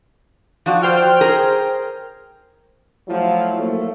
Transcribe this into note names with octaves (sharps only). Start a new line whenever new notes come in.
F3 F#4 D5
C5 G5 F6
G#4 A#4
F3 F#3 A3 E4 F4
F#3 A3 A#3